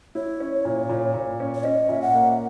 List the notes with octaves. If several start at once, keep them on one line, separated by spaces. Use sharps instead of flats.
E4 C#5
C#4
A#2
A#2
A#2
C#4
C#5
C#4 D#5
A#2 E5
F#5
A#3